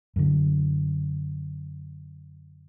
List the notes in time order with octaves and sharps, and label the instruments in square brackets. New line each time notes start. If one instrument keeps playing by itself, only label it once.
[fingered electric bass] F#2 D3